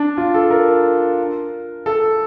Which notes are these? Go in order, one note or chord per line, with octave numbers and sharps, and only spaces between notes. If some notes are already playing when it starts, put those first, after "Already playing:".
Already playing: D4
F4
A4
A#4
A4